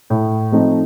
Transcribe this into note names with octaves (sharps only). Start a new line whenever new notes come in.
A2
F3 A3 C4 D#4